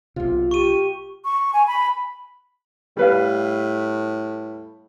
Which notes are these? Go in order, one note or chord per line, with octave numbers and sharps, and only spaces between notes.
B1 C3 F4
G4 C#6 D#7
C#6
G#5
B5
A2 G3 B4 F5